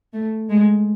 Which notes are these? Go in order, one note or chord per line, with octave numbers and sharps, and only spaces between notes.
A3
G#3